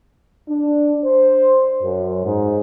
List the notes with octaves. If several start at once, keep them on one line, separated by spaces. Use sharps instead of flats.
D4
C5
F#2
G#2